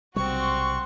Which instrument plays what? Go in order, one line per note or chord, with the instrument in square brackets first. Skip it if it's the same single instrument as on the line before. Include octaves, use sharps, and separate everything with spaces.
[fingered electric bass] B1 C3 G3 [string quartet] C4 F#4 [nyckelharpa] F#5 C6 [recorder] C#6